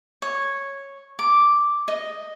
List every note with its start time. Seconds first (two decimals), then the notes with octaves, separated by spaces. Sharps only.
0.22 C#5
1.19 D6
1.88 D#5